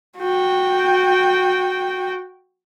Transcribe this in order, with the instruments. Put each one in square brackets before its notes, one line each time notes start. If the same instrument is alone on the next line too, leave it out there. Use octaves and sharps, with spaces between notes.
[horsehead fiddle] F#4 G5